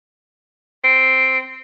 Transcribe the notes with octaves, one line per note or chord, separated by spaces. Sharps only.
C4